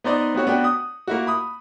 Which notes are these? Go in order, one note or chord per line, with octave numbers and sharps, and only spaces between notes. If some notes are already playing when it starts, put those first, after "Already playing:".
B3 D#4 C5 D5 D#5
B3 C4 F#4 C#5
B3 D4 F#4 G5
D#6
A#3 E4 F#4
B5 D#6